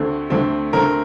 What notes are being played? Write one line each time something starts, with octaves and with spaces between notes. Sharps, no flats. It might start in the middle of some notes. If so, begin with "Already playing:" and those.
Already playing: D2 D3 A3 C4
D2 D3 A3 C4
D2 D3 A3 C4 A#4